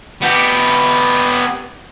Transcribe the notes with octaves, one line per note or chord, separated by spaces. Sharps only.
B3 G4